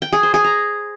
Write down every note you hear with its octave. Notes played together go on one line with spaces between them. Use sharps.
G5
G#4
C5
G#4
A#5